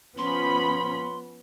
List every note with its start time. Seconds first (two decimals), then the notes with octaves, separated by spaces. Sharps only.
0.18 F3 B3 C#4 B5 C6